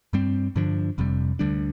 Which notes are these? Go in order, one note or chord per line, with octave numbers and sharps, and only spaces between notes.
G2 G3 C4
G2 D3 F3 D4
F1 F2 C3 G3
D2 D3 G3 D4